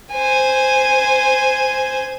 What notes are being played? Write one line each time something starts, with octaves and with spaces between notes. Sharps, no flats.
C5 G#5